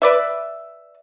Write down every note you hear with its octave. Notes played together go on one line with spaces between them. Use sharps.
B4 D5 E5